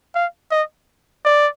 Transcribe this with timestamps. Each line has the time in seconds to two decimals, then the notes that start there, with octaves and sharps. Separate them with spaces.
0.15 F5
0.51 D#5
1.25 D5